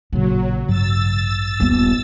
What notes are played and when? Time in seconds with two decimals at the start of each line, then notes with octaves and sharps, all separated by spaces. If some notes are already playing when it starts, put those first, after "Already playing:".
0.13 A1 A#2 C#3 F#3
0.68 A1 G2 F#3 E6 A6
1.60 D#1 B3